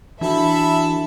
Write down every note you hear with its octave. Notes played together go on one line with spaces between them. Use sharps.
E3 D4 F#4 A4 E5 B5